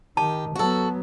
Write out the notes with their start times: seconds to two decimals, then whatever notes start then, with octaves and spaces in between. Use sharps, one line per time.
0.17 D#3 G4 A5
0.55 F#3 B3 F#4 A4